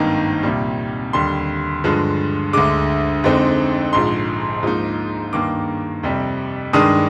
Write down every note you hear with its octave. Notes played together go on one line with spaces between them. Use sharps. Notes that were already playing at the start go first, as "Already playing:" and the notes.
Already playing: G#1 G2 D#3 A#3 D#4
C2 A#2 G3
D#2 D3 G3 C6
G2 D3 F3 G#3
D2 D3 G#3 D6
F2 D3 G#3 C4 D#4
A#1 G#2 F3 C6
G#2 F3 A#3 D#4
G2 D#3 A#3 D6
F2 C3 G3
G2 D#3 G#3 D4 D#6